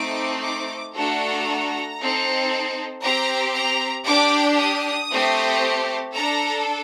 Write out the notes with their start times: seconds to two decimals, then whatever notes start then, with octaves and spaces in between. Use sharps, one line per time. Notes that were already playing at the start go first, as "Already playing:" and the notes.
Already playing: A3 C4 D#4 D6
0.43 D6
0.95 A3 D4 F#4 A4 A#5
1.99 C4 D#4 A4
3.03 C4 G4 A#5
3.55 A#5
4.07 D4 G4 D6
4.58 D#6
5.10 A3 C4 G4
6.14 D4 A4 A#5